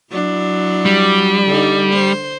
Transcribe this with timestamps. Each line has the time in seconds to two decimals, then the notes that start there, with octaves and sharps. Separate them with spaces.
0.11 F#3 D4 E4
0.85 G3
1.46 D3 D#4
1.93 C5